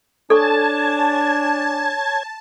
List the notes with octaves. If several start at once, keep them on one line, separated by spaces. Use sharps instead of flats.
D4 A4 C#5 G#5 A5 C#6 G#6